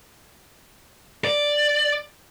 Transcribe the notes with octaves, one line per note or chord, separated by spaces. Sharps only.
D5